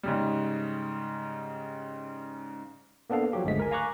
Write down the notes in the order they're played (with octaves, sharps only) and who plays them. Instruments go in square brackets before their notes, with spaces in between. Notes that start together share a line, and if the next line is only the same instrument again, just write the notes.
[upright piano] G#2 C#3 G3
[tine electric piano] A#3 B3 D4 A4 F5
F3 F#3 G4
G1 C#2 D3 G#3 A3 B6
A#4 G#5
F5 G#5 A#5 C#6 D6 F#6